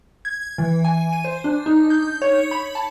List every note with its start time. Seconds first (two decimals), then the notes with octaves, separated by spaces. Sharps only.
0.25 G#6
0.58 E3
0.85 G#5
1.12 D#7
1.25 C5
1.44 D4
1.66 D#4
1.90 G6
2.22 C#5
2.51 B5
2.75 A5